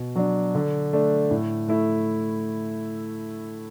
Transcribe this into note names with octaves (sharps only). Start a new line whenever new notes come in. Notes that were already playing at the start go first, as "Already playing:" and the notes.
Already playing: B2
F#3 D4
D3
A3 D4
A2
A3 E4